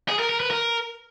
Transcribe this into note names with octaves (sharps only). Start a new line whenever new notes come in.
G#4
A#4
A#4
B4
A#4